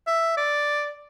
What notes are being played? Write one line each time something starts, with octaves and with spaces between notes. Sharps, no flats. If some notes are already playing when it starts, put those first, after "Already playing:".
E5
D5